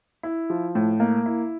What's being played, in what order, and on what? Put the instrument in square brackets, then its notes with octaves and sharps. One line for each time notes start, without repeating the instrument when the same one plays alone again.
[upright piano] E4
F3
A2
A#3
E4